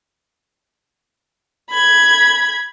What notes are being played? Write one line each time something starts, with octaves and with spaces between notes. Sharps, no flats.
B5 G#6